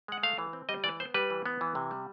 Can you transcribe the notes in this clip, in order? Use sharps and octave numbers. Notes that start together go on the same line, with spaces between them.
G#3 F#5
A3 F5
E3
C4
G3 D#5
E3 D5
B3 C5
G3 B4
E3
B3
E3
C3
G3